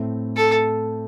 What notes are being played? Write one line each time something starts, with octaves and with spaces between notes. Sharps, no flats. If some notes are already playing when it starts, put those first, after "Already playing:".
Already playing: A2 A3 C4
A4